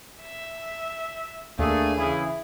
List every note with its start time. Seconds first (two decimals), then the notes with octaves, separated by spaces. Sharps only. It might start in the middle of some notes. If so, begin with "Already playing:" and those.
0.21 E5
1.59 D#2 A3 A#3 D4 G#4
1.96 C#3 E3 E4